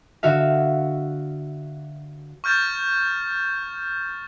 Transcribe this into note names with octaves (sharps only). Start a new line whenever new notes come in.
D3 F#4 E5 F5
C#6 F6 G6 A6 E7